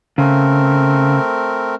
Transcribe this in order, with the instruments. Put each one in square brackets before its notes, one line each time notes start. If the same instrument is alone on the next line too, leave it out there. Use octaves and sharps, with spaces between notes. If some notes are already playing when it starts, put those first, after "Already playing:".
[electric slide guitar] C#3 [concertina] A3 C4 A#4